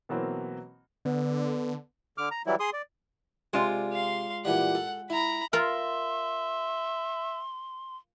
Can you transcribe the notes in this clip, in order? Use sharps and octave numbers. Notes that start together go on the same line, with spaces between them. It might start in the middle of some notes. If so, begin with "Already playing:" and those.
B2 E3 F#3 A#3 C4
D3 B3
D3 D6 F6
A#5
E3 F#3 G3 E4
G#4 C6 D#6
D5
C3 G#3 F4 D5
F5 C6
A#2 E3 G3 F#5
A4
E4 A#5 B5
F4 A#4 E5 C6